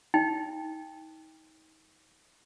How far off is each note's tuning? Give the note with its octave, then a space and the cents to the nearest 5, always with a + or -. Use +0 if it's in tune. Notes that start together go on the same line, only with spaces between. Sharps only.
D#4 +30 G5 +20